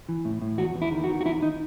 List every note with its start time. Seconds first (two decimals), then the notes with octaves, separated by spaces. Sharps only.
0.09 E3
0.25 A2
0.42 A2
0.58 E2 F#4
0.75 E2
0.82 E4
0.92 D#3
1.04 F#4
1.09 D#3
1.21 F#4
1.26 E2 E4
1.42 D#4